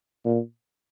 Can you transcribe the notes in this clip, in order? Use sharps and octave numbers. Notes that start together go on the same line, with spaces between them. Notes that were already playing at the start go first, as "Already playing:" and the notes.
A#2